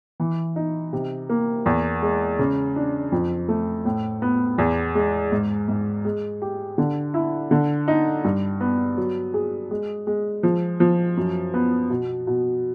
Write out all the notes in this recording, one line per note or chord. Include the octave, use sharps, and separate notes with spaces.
E3
D#4
C3
A#3
E2
G#3
C#3
D4
F2
A3
A2
B3
E2
G#3
G#2
G#2
G#3
G4
D3
E4
D3
D#4
G2
B3
F#3
G#4
G#3
G#3
F3
F3
F#2
B3
B2
B2